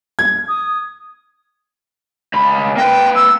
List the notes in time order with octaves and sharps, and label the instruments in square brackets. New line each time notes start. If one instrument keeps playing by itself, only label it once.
[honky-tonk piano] G#6
[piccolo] D#6
[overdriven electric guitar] C#2 B5
[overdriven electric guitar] A#3 B4 [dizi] G5
[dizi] E6